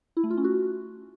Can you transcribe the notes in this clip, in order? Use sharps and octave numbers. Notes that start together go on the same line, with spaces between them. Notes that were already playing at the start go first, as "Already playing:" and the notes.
E4
A3
F4
C#4
F#4